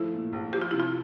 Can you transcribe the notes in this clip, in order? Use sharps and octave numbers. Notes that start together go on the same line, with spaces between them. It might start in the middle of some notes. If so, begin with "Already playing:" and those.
Already playing: F3 A3 E4
A#2
A#1
F3 G4
F4
C3 E4
F4